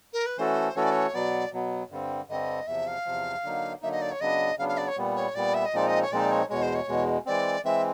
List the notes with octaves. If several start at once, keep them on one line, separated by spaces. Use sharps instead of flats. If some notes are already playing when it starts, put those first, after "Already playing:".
A#4
B4
E3 A3 C#4 F#4 A4 C5
E3 A3 C#4 F#4 A4 C#5
D5
C#5
B2 F#3 B3 D5
B2 F#3 B3
G2 D3 G3 C4
G2 D3 G3 C4 D#5
E2 C3 F3 E5
F5
E2 C3 F3
D3 F#3 A#3 D#4
D3 F#3 A#3 D#4 E5
D#5
D5
C#5
C#3 F#3 B3 D4 D#5
C#3 F#3 B3 D4 F5
F5
D5
C#5
A#2 G3 B3
C#5
A#2 G3 B3 D5
E5
D#5
A#2 F3 G#3 C4 D#4 D5
D#5
C#5
A#2 F3 G#3 C4 D#4 D5
C#5
E2 B2 G#3 C#5
C5
C#5
E2 B2 G#3
E3 G#3 C4 D5
E3 G#3 C4 E5